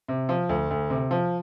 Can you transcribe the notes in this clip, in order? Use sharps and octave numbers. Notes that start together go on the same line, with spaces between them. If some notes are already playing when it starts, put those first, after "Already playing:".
C3
F3
D2
D2
C3
F3